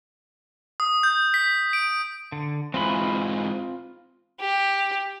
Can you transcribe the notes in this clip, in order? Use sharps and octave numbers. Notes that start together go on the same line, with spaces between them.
D#6
G6
B6
D7
D3
G#2 E3 C4 F4 B5
G4